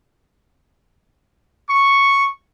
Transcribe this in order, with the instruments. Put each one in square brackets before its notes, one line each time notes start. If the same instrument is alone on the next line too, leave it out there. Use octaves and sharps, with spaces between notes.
[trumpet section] C#6